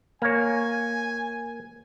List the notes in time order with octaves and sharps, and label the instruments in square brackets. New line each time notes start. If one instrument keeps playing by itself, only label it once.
[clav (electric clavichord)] A#3 C#5 [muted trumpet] G#5